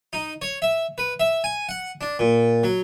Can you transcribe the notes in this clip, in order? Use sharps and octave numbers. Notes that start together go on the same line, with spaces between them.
D#4
C#5
E5
B4
E5
G#5
F#5
D4
A#2
F#3